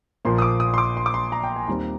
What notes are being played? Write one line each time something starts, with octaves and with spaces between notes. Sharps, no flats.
A#1 A#2 F3 A#3 C6
D#6
D6
D#6
C6
D6
C6
D6
C6
A#5
G5
G#5
D#2 D#3 G3 C4 A#5